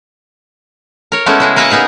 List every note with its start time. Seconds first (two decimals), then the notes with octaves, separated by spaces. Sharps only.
1.12 A#4 C#5
1.26 G#3 A3 B3 C#4 E4 F#4
1.40 C#3 G#3 E4
1.56 A#3 A#4 B4 E5 F#5
1.70 B3 D#4 G#4 A#4